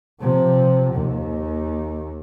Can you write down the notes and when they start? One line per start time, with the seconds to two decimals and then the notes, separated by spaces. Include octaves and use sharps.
0.21 C3 F3
0.94 D#2